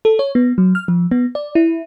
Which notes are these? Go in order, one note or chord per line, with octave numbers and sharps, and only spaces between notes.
A4
C#5
B3
F#3
F6
F3
B3
D5
E4